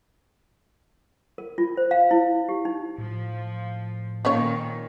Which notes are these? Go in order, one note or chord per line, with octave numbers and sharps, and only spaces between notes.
A#4
F4
C5
F5
E4
G4
D#4
A2 F3
A#2 D#3 F3 C#4 C#5